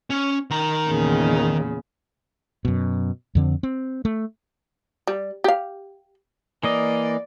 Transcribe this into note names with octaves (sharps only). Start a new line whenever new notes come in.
C#4
D#3 A#5
E2 A#2 C#3
F#2 B2
F2 D3 C4
C4
A3
G3
G4 F5
E3 A#3 D5 D#5